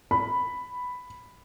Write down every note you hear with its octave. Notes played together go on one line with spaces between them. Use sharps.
B5